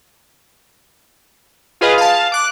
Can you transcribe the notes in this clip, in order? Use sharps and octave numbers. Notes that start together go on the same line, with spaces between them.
F4 G#4 B4 D#5 F5
F5 A5
D6 F#6